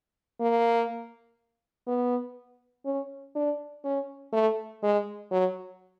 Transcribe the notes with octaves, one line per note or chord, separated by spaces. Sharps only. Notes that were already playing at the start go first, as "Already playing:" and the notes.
A#3
B3
C#4
D4
C#4
A3
G#3
F#3